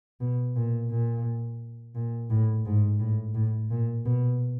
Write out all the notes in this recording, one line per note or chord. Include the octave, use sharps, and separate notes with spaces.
B2
A#2
A#2
A#2
A2
G#2
A2
A2
A#2
B2